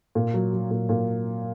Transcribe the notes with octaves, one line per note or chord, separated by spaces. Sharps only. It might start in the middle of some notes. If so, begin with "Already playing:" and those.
A#2
F#3
F#3
A#2
A#2